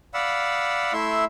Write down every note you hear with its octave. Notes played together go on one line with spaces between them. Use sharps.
D5 F5 F#5 B5 E6
A3 E4 E5 C6 E6